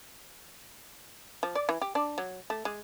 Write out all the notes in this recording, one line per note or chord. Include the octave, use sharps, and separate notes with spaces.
F3
D5
E3
G4
D4
F#3
A3
G#3